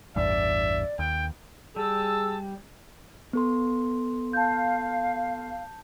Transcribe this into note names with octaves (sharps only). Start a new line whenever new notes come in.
A1 E2 G2 D5 E5
D#2 G5
G3 G#4 A5 E6
B3 A4 C6
F5 A5 G6